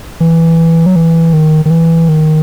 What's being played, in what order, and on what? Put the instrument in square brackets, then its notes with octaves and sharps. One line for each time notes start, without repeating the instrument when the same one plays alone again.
[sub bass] E3
F#3
E3
D#3
D#3
E3
D#3